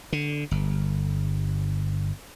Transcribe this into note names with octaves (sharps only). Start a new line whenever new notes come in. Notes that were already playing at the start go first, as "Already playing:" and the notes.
D3
G1